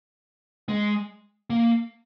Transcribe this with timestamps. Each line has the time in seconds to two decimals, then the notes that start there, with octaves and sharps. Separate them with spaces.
0.69 G#3
1.50 A#3